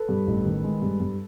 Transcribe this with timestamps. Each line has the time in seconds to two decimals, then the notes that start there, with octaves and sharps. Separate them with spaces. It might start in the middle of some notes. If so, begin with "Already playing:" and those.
Already playing: A4 B4
0.09 G2
0.27 A1
0.45 D#3
0.64 G#3
0.82 G2
1.00 G2